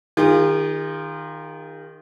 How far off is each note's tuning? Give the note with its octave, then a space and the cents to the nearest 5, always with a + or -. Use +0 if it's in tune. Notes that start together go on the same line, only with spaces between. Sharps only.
D#3 +0 F4 +0 G#4 -45